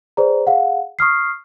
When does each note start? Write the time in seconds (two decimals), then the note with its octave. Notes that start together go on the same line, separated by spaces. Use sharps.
0.17 G#4 B4 C5 D5 A#5
0.47 G#4 F5 F#5
0.99 C#6 D#6 F6 C7